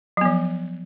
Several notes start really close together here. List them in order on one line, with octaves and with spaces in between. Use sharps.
F#3 B3 F3